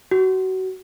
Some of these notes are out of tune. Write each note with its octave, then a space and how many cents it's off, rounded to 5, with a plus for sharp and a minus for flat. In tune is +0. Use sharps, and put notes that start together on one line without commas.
F#4 +25